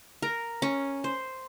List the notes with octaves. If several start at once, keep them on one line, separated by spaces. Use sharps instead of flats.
A#4
C#4
C5